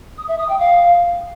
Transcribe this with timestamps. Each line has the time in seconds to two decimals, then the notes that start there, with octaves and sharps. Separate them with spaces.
0.17 D#6
0.28 E5
0.38 D#6
0.48 G5
0.59 F5